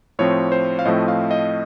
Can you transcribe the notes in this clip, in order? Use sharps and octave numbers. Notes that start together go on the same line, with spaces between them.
A2 F3 C4 C#5
C5
F5
A2 F3 A3 C4 D#5
F5
D#5